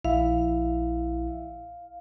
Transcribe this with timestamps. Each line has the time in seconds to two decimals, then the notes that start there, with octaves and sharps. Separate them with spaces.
0.05 A#1 E4 E5 F5